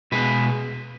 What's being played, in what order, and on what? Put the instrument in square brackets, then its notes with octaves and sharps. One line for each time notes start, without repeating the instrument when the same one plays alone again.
[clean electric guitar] B2 G#3 B3 B4